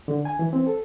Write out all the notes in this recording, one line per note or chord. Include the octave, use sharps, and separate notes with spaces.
D3
G#5
E3
C4
A4